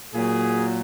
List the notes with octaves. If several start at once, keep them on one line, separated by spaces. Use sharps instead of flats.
A#2 F#3 G#4